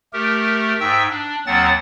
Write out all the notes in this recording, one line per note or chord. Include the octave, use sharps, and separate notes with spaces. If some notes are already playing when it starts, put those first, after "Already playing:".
A3 G4 A#4
G#2 E5 G5 E6
D4
D#2 F#3 C4 F#5 A6